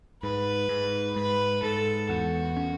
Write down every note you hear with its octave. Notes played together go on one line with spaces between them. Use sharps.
G#2 B4
G#2
G#2 B4
G#2 A4
E2 F#4
C#4